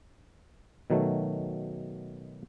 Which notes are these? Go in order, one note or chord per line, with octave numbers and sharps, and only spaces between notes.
B2 D#3 F#3 A3